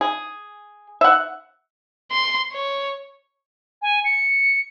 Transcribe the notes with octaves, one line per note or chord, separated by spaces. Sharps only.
G#4
E5 F#5
C6
C#5
G#5
C#7